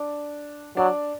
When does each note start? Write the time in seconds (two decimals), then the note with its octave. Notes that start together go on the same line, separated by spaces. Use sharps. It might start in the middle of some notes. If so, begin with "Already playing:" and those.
Already playing: D4 D5
0.77 F#3 D4 D5